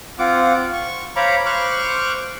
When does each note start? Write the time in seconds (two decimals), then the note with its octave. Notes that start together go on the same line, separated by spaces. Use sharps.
0.19 C4 F4 F#5 D6
0.73 C#6
1.16 C5 C#5 F5 A#5 B5 D6
1.46 C5 C#6 D6 F6 F#6